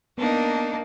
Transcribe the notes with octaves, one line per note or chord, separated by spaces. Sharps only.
A#3 B3 D4 D#4